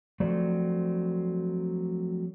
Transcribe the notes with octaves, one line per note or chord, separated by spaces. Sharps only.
F3 F#3 A3 C4 A4 D5